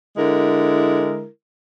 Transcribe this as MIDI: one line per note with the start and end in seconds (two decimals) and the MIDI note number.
0.17 1.26 50
0.17 1.26 56
0.17 1.26 64
0.17 1.26 70